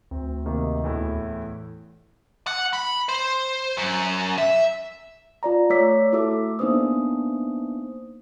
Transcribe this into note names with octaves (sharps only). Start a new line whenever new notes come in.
D2 C4
C3 D#3 A#3
E2 A2 E4
F#5
B5
C5
F#2
E5
F4 D5 A#5
A3 C#5 D6 E6 B6
A3 E4 F#4 A4 D6 E6
A#3 B3 D4 D#4 C5 D#6